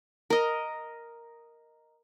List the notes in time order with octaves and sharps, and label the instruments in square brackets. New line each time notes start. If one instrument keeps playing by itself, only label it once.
[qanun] A#4 D#5